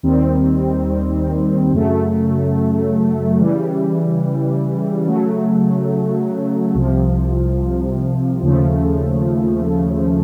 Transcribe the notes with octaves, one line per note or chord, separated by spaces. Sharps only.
D#2 D#3 G3 C4
F#2 C#3 F#3 A3
C#3 E3 G3
C#3 F#3 A3
C2 C3 F3
D#2 C#3 F3 A3